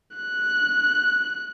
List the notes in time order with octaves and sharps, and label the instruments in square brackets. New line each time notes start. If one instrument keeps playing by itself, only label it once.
[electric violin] F#6